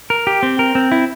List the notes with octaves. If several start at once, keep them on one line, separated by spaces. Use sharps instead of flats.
A#4
G4
C4
A#4
C4
E4